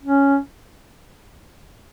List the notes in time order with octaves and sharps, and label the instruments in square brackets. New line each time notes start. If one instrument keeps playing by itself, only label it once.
[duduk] C#4